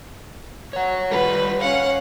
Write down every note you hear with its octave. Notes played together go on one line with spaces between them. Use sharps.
C#5 F#5
G3 F4 B4
C#4 F5 F#5